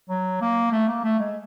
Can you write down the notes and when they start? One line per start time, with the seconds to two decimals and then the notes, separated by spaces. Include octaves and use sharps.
0.09 F#3
0.41 A#3
0.72 A3
0.88 A#3
1.04 A3
1.19 G#3